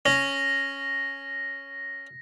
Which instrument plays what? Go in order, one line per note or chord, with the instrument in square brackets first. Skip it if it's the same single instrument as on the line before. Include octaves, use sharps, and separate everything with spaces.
[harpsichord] C#4 [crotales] A#6